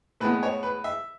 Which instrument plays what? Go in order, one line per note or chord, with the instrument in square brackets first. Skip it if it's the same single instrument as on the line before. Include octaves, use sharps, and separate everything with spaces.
[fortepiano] A2 G#3 B3 B4
C#5
B4
E5